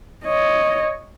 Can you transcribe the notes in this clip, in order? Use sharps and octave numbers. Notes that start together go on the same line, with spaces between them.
C#5 D#5